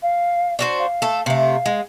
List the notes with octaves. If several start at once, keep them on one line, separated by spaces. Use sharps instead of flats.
F5
D4 F#4 C5
F5
A3 A4
C3 A3 F5
G#3